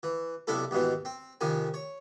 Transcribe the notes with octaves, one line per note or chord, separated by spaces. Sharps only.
E3
B1 C3 D4 E4 A4
D#2 G#2 B2 E3
C4
F2 C3 D#3 G#5
C#5